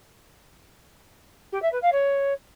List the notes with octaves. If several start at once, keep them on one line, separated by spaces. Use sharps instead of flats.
G4
E5
B4
F5
C#5